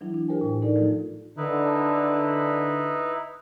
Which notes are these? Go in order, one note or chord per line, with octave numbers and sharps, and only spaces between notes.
E3 F#3 D4 E4
D4
F4 G4 A#4 C5 G5 G#5
A2 G#5
D#4 A4 A#4 D5
F3 A3 D#4 F4
D3 D#4 E4 B4